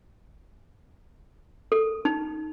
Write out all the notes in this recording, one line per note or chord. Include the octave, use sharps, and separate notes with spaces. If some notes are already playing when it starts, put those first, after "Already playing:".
A4
D#4